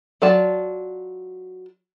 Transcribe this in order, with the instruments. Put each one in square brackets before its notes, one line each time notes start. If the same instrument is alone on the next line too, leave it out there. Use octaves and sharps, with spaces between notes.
[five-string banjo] F#3 F4 D5 A5